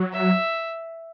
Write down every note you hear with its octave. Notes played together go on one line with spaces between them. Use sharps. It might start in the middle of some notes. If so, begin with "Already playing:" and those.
Already playing: F#3
E5